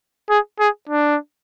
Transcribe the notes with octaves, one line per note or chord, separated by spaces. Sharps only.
G#4
G#4
D4